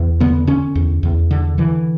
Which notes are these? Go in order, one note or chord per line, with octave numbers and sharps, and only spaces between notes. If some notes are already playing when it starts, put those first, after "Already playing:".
Already playing: E2
D3 B3
D3 C#4
E2
E2
D3
D3 E3